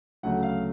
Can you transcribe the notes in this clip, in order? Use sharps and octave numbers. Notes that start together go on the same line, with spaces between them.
D2 C#3 F#3 A3 F#5
F5